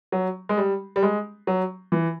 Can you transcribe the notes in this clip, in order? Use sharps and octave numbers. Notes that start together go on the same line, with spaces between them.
F#3
G#3
G3
G3
G#3
F#3
E3